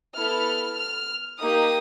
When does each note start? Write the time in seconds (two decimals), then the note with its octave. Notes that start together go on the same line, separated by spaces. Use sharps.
0.15 B3 E4 A4 F6
0.77 F6
1.38 A#3 D#4 G4 D#6